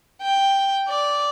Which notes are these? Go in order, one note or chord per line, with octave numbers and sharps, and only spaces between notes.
G5
D5